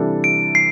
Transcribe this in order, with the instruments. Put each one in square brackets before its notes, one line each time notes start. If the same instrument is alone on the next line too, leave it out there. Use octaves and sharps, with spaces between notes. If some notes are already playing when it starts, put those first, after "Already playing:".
Already playing: [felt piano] C3 E3 G3 D4 A4
[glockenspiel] D7
C7